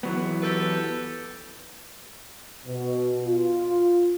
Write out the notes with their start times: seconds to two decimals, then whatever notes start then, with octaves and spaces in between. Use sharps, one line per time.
0.03 E3 F#3 B3
0.42 G4 A4 B4
2.65 B2
3.24 F4